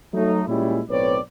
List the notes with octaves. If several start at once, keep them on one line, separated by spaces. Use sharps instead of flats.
F#3 A3 D#4
A#2 G3 G#3 C#4 E4
B1 A2 C4 B4 C#5 D5